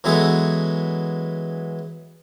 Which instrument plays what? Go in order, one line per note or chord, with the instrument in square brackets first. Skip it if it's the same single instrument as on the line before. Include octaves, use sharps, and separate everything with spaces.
[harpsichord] E3 F#3 G#3 B3 G#4 A4